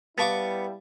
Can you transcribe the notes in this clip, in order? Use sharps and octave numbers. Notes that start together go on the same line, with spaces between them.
G3 B3 E4 F5 A5 C#6 D6 A6